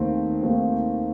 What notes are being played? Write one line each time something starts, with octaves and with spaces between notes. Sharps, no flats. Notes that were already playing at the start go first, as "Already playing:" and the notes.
Already playing: D#2 D#3 A3 C4
D#2 D#3 A3 C4